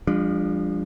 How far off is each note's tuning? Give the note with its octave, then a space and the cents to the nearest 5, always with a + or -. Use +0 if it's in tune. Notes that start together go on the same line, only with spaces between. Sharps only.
F3 +0 G#3 -45 D4 +0